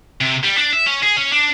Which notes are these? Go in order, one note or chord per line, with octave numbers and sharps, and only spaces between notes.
C3
G3
D4
E5
C#4
G#4
C#4
D4